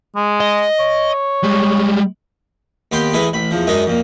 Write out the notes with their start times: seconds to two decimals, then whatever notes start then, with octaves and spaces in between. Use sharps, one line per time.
0.16 G#3
0.41 D#5
0.80 C#5
1.43 G3 G#3
2.92 D#2 B3 G4 G5 C6
3.13 A1 E3 G#3 B4
3.33 A1 B5
3.51 E2 F3
3.67 F#2 G#3 D4 D#4
3.86 F2 A#2